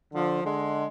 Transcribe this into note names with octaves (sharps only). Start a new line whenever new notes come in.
D3 F3
D3 G#3